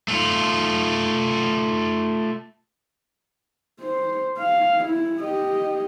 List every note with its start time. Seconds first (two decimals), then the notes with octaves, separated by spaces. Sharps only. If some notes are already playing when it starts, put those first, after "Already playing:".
0.08 A3 F4
3.81 C5
4.38 F5
4.85 E4
5.21 G4 D#5